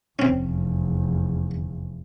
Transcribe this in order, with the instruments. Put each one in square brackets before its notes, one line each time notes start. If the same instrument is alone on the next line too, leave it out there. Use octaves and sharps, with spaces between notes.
[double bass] F1 E2 [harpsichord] C4 C#4